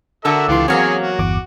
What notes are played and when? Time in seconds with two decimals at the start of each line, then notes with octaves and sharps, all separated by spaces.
0.25 D3 F#4 A4 A#4 E5 E6
0.48 C#2 E3 D4 F4 G4 C6
0.68 E2 F#3 A#3 C4 G#4 C#5 F5 G#5
1.01 F#4
1.19 G1 E2 D6